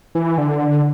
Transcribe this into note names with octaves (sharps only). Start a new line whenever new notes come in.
E3
D3